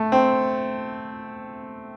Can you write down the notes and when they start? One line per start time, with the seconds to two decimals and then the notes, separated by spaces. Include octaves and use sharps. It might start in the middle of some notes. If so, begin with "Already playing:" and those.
Already playing: A3
0.12 C4